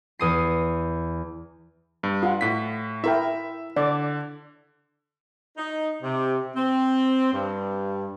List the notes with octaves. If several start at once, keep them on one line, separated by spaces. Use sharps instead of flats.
E2 D#6 C7
G2
F4 F#5
A2 B6
E4 A#4 E5 G5
D3 D5
D#4
C3
C4
G2